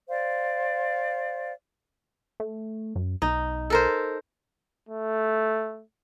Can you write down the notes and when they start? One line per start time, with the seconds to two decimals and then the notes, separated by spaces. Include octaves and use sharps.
0.08 C5 D5 F5
2.40 A3
2.95 F#2
3.22 B1 D#4
3.70 A4 A#4 C5
4.89 A3